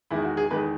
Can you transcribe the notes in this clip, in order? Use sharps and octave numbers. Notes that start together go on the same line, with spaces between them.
E2 D#3 G#3 E4
F#4
G#4
E2 D#3 G#3 B4